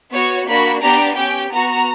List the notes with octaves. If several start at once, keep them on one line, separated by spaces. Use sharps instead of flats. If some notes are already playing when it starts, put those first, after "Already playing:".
B3 F#4 C#5
A#3 D4 F#4 B5
B3 D4 G4 A#5
C#4 G4 G5
B3 F#4 A#5